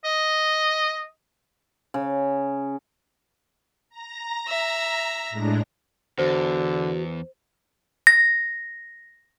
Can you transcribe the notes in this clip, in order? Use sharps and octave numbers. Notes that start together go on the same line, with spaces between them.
D#5
C#3
A#5 A#6
E5
A2 G#3 D4
E2 D3 F#4 C5
A#6